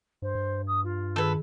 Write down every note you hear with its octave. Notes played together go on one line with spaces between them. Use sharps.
G2 C5
G2
D#6
F4
D#3 G#4 A4 B4 E6